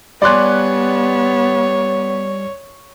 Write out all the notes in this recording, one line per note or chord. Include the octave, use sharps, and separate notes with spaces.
G3 B3 G4 C#5 D5 G#5 C6 F#6